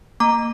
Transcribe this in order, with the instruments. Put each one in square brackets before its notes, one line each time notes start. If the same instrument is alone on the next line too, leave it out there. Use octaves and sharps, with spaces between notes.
[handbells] A#3 A#5 D6